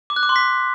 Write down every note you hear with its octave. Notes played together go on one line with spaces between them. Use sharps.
D6
F#6
D6
C6
B6